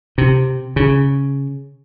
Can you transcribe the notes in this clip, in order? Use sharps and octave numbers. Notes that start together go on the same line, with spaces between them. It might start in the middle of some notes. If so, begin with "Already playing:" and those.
C3
C#3